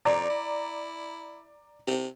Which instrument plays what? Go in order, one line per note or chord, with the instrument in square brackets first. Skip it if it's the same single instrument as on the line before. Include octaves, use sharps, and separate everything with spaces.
[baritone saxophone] F2 [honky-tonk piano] D5 A#5
[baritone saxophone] E4
C3